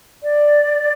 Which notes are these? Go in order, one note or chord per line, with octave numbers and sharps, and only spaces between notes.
D5